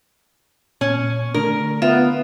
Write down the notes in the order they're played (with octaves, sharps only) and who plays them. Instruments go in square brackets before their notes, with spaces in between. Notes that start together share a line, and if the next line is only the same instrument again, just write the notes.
[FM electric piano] A#2 [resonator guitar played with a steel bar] C#4
[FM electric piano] D3 A3 D4 [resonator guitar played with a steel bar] A#4
[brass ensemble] B3 [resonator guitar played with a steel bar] F4 [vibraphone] E5